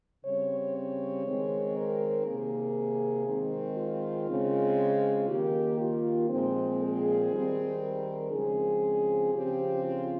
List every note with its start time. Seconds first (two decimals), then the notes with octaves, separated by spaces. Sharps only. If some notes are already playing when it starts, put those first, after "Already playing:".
0.25 C#3 G3 C4 C#5
0.75 C#5
1.25 D#3 G#3 C4
1.76 A#4
2.27 C3 D#3 A#3 G#4
3.28 D#3 G#3 C4
3.78 F4
4.29 C#3 G#3 C4
4.79 F4
5.29 D#3 A#3 G4
5.80 F4
6.30 A#2 F3 G#3 C4
6.81 G#4
7.32 D#3 G3 C4
7.82 A#4
8.32 C#3 F3 G#3 C4 G#4
9.33 C#3 F3 C4 G4
9.83 F4